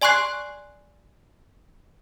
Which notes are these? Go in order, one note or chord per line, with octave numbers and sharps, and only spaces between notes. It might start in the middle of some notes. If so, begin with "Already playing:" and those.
D5 G#5 C6 C#6 F#6 C7